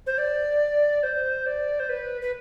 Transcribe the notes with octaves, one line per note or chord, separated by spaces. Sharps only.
C5
D5
C5
D5
C5
B4
B4